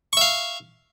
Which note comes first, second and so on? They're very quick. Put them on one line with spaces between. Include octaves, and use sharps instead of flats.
C#6 E5 F5